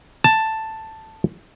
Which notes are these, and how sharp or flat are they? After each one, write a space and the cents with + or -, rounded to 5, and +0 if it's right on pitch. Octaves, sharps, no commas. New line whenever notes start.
A5 +5